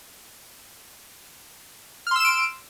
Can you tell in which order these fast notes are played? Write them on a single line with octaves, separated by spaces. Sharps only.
F6 C6 E6 E7 D7